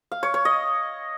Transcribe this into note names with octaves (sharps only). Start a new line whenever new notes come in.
F5
C#5
C#5
D#5